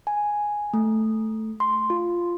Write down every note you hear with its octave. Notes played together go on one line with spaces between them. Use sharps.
G#5
A3
C6
F4